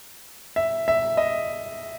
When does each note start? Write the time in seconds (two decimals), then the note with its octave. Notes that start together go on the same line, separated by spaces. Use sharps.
0.56 E5
0.88 E5
1.17 D#5